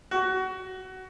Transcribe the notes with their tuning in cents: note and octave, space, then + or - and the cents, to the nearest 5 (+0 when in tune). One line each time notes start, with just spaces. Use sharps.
F#4 +20